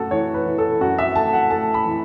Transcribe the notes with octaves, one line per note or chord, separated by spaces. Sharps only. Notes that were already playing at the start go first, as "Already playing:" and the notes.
Already playing: F#2 A3 F#4 A4
E3 C#5
B4
E3
A4
F#2 F#4
E5
A3 A5
F#5
A3 A5
B5
E3